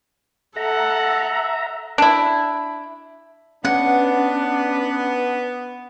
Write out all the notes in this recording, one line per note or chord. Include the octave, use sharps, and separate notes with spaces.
A4 E5 F#5 A#5
D4 E4
B3 C#4 D4 F#5